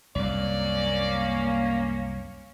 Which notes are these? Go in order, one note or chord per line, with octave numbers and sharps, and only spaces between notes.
C2 F#2 A#3 C#4 D5